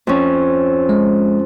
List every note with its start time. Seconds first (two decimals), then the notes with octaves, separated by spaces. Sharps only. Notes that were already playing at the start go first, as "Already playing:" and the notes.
0.07 F2 C#4
0.89 G#3